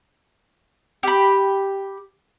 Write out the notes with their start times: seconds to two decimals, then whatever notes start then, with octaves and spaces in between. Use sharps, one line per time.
1.03 G4 B5